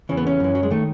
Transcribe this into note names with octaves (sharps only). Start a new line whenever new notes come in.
E2 C#3 E3 C#4
B3
C#4
F#2 E3
F#3
G#3
D#3 A3